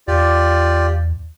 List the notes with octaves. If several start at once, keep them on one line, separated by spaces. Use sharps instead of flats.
E2 F4 G4 D5